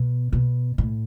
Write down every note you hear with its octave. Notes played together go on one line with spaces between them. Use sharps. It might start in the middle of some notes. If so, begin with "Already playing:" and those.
Already playing: B2
B2
A2